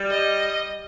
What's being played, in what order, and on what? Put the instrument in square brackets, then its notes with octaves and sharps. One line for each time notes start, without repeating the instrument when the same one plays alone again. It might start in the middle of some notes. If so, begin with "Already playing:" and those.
Already playing: [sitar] G3
[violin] D#5